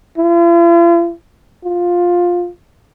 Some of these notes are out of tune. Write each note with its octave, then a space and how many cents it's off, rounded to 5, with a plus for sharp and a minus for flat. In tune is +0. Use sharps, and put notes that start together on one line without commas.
F4 -45
F4 +10